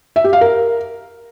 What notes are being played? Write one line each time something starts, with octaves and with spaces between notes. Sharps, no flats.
E5
G4
F5
A#4